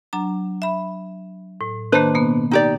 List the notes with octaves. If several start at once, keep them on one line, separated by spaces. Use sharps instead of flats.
F#3 D4 A#5
E5 B5
A2
D#3 A#3 D4 B4 C5
B2 A#3 B3
D#4 G4 D5